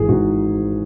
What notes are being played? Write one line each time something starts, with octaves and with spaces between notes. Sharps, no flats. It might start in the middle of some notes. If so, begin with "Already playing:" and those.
Already playing: G#1 E3 G#4
G#2 F#4